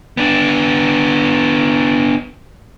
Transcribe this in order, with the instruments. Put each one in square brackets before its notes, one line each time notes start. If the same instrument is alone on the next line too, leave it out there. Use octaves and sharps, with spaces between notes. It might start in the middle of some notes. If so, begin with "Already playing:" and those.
[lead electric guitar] B3 D4